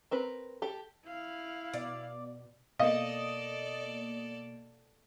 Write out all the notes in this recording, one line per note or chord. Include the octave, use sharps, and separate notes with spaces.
C4 A#4 B4
G4 A4
E4 F5
B2 D5
B2 A#3 A4 D5 D#5 F5